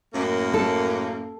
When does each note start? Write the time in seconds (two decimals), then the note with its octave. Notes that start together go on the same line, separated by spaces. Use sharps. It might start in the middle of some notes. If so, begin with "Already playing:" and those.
0.14 F#2 A2 A#3
0.54 A4